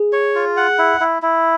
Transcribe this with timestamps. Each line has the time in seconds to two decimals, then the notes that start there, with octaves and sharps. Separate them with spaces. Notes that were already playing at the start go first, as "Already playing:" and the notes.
Already playing: G#4
0.13 C#5
0.35 F4
0.57 F#5
0.78 E4
1.00 E4
1.22 E4